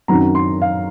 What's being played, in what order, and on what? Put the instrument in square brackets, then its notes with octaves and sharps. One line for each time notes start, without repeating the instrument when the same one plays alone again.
[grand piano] F#2 D#3 F#3 C4 A#5
C6
F5